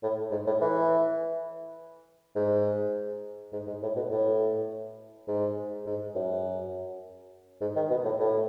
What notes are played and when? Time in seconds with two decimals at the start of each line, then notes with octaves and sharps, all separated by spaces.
0.03 A2
0.31 G#2
0.47 A2
0.61 E3
2.35 G#2
3.52 G#2
3.67 G#2
3.82 A2
3.95 B2
4.10 A2
5.28 G#2
5.86 G#2
6.15 F#2
7.61 G#2
7.76 D#3
7.90 B2
8.04 A2
8.20 A2